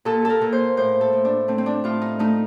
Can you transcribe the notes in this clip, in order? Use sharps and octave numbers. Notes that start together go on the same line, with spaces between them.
A#2 A4
A4 A#4
A#2
C5
A2 C5
A4
A2
D4
A3 C4
C4
D4
A2 F4
D#4
A3 D#4